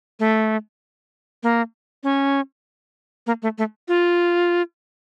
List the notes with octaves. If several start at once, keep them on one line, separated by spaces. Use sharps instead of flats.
A3
A#3
C#4
A#3
A3
A3
F4